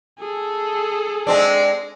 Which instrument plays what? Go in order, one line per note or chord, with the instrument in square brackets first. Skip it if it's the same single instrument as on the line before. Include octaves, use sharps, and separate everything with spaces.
[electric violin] G#4 A4
[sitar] G#3 C4 D4